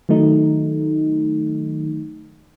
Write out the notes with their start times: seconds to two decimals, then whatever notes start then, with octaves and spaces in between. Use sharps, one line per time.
0.09 D#3 F#3 A3 D#4